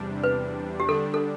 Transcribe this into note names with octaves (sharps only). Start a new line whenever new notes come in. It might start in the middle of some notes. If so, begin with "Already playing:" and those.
Already playing: E2 C3 G3 D4
B4
G4
D3 G3 D4 A4
A4